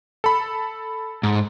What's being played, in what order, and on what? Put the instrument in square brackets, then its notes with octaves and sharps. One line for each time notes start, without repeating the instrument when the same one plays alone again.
[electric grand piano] A4 B5
[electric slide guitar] G#2